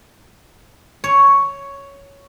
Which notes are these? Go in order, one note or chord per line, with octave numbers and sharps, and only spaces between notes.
C#5